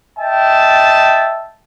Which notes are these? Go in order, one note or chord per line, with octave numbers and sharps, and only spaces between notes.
D#5 E5 G5 A5